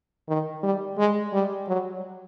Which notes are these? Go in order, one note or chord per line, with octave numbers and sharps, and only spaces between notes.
D#3
G3
G#3
G3
F#3